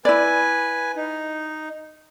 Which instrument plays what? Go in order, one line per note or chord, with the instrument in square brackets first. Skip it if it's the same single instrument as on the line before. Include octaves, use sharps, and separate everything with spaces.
[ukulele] E4 D5 [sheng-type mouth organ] B4 G#5
[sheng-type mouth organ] D#4